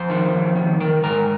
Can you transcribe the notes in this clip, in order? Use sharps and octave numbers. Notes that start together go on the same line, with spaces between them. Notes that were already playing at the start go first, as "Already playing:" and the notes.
Already playing: F2 C5
D#3
F2
D#3
D#3 A#4
G#2 A#4